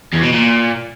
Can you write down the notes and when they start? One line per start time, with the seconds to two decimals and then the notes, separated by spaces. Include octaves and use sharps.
0.13 E2
0.23 B2
0.33 A#2